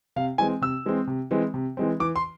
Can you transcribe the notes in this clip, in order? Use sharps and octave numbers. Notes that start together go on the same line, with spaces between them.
C3 F5
E3 G#3 C4 G#5
C3 E6
E3 G#3 C4
C3
E3 G#3 C4
C3
E3 G#3 C4
E3 D6
C6